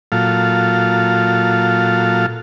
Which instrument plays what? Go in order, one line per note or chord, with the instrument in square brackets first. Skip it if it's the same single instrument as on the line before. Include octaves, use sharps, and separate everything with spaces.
[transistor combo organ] A#2 F#3 F4 A4 F5